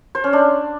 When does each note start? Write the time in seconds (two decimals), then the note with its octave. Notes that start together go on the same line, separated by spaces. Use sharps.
0.15 C5
0.24 C#4
0.33 D4